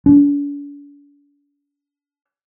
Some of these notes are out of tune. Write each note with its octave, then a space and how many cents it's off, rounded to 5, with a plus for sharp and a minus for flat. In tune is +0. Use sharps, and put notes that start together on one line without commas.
D4 -45